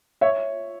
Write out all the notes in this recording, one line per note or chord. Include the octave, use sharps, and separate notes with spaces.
C#5 E5